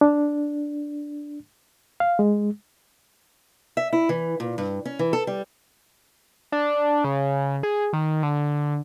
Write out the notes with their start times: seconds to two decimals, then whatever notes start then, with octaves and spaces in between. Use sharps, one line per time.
0.01 D4
2.00 F5
2.19 G#3
3.77 E5
3.93 E4
4.09 E3
4.40 A#2
4.58 G2
4.85 C#4
4.99 E3
5.13 A4
5.27 G3
6.52 D4
7.04 C#3
7.63 G#4
7.93 D#3
8.23 D3